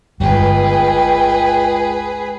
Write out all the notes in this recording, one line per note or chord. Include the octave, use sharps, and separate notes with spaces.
G1 C#2 G2 G#4 B4 G5